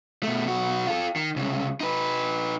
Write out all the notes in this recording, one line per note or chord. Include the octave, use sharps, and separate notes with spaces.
B2 A3
B1 F#4
F4 A4
D#3
C2 C#3
D#4 B4